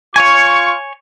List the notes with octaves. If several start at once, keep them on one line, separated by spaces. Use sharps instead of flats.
F4 C#5 G#5 C#6